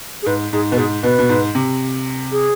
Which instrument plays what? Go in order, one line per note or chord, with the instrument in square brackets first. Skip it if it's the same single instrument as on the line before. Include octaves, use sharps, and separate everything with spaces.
[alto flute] G#4
[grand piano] G#2 [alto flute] B4
[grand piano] G#2 [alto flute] G#4
[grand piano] B2 [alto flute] B4
[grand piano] G#2 [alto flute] G#4
[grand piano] B2 [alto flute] B4
[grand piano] B2
G#2
C3
[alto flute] G#4